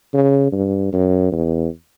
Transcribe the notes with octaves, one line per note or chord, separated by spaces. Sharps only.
C#3
G2
F#2
E2